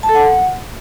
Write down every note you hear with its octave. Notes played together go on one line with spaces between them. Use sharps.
A5
A4
F#5